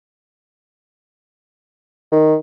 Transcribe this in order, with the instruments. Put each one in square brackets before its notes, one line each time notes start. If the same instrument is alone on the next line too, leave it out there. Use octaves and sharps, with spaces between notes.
[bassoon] D#3